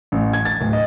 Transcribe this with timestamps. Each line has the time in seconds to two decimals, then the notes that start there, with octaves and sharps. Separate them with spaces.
0.12 A1
0.33 G#6
0.45 A6
0.61 D1
0.73 D#5